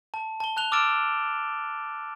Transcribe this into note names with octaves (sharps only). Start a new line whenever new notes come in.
A5
A5 G7
A5 F#6 F7 G7
D6 E6 F6 A6 D7 E7